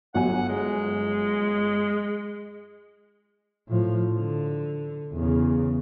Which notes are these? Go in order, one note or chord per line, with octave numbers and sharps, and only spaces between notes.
G1 F#3 F#5 G#5
G#3
A2 F3
D3
E2 C#3